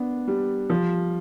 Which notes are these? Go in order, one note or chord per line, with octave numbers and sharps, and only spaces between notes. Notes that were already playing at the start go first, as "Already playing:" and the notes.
Already playing: B3 D4
G3
F3